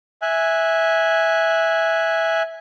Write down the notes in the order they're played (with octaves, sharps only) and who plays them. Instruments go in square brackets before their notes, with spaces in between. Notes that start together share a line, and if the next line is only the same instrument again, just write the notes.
[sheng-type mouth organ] E5 G#5 F#6